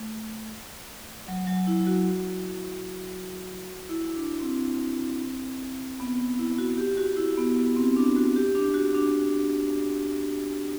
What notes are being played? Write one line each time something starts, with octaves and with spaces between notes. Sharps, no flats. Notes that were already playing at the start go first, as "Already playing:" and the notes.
Already playing: A3
F#3
F#3
E4
F#4
E4
D4
C4
B3
E4
F#4
G4
F#4
E4
B3
B3
C4
D4
F#4
G4
D4
F#4
D4